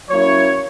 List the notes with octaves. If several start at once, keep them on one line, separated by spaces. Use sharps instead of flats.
F#3 A#3 C#4 E4 C#5